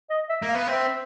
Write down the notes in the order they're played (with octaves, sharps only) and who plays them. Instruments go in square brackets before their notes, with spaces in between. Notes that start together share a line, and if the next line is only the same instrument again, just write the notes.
[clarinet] D#5
E5
[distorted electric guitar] A#3
[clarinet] F5
[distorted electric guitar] B3
[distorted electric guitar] C4 [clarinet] E5